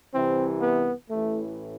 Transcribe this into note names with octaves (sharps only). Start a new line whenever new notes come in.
C2 C3 E3 C4
B3
A1 A2 E3 A3